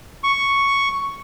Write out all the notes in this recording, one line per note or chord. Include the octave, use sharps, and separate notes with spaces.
C#6